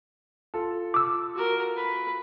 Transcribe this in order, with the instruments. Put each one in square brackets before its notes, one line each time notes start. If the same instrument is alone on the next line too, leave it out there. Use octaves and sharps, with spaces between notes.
[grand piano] F4 A4
[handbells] D6 E6
[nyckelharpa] F#4 A#4
B4